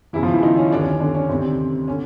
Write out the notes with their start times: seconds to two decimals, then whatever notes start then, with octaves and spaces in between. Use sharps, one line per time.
0.13 E2 C#3 E3 E4
0.23 F3 F4
0.33 E3 E4
0.43 D#3 D#4
0.57 C#4
0.72 D#2 D3 D4
0.81 C#4
0.92 C#4
1.00 D3 D4
1.15 C#4
1.29 D2 C3 D#3 C4
1.88 D3 C#4